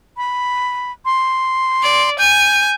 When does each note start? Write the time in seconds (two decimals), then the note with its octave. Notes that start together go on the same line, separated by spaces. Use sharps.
0.17 B5
1.05 C6
1.83 D5
2.19 G#5 G6